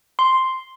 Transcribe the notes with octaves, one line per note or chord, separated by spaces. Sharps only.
C6